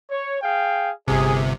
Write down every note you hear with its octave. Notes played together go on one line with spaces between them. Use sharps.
C#5
G#4 F5 G5
G1 C3 G#4